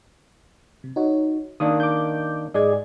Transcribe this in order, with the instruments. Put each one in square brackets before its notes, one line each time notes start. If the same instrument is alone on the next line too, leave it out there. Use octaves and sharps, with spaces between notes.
[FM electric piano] C3
D#4 F#4 C#5
[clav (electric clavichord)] D#3 A#3 D4 [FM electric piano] D#6
[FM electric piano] D6 G6
[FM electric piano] G#2 D5 G#6 [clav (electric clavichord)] G#4 D#5